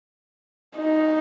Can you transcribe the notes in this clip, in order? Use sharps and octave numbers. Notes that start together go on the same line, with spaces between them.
D#4